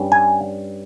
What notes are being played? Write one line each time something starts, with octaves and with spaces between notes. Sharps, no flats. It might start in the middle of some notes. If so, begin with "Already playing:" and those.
Already playing: G2 G3 C#4
G#5